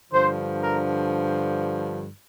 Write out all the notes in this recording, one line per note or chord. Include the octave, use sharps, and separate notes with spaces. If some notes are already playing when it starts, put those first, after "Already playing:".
G2 D3 F3 C5
A#4